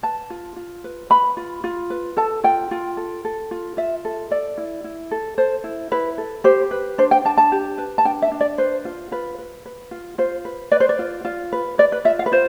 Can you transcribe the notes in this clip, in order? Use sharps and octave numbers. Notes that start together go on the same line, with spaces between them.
B4 A5
F4
F4
B4
B4 B5
F4
F4
B4
A4 A5
F4 G5
F4
A4
A4
F4
F4 E5
A4
A4 D5
E4
E4
A4
A4 C5
E4
E4 B4
A4
G4 C5
B4
D4 C5
G5
D4 A5
A5
G4
B4
A5
D4 G5
E5
D4
D5
B4 C5
F4
F4 B4
B4
B4
F4
F4 C5
B4
B4 D5
C5
D5
F4
F4
B4
B4 D5
B4
F4 E5
F5
B4
F4 C5